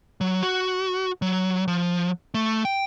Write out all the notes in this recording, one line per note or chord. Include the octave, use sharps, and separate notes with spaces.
F#3
F#4
F#3
F3
A3
G5